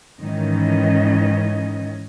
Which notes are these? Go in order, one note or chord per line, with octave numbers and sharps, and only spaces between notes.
G#2 D#3 E3 C#4 D#5